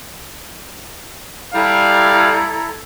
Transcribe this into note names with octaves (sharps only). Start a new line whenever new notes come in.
G3 E4 A4 F5 A#5